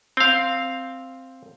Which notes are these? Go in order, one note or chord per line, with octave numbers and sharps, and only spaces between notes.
C4 F5